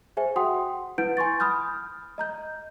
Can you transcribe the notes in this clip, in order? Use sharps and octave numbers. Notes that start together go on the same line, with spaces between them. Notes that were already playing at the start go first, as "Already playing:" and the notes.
G#4 C5 E5 G#5
F#4 F#5 G5 C6 D#6
E4 B4 F#5 G6 D7
G#5 C6 C#6 A6
B5 D#6 F6 G6
D#5 A#5 G6